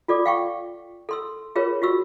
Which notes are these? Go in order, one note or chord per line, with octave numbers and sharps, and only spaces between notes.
F4 A4 D5 D6
F5 G5 C#6
A4 C6 E6
F4 G#4 A#4 B4 C#5
F4 F#4 C#6 E6